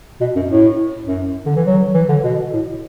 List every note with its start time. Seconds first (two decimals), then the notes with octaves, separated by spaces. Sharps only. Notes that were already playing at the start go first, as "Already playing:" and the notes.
0.21 B2
0.36 F#2
0.50 A2
1.08 F#2
1.46 D3
1.56 E3
1.66 F#3
1.94 E3
2.09 D3
2.24 B2
2.53 A2